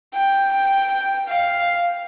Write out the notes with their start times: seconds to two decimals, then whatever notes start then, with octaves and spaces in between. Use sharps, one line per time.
0.14 G5
1.28 F5